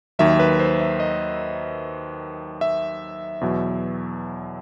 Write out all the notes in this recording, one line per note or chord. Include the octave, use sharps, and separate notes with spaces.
D#2 D#3 F#3 E5
B4
C5
E5
D#5
E5
E2 B2 F#3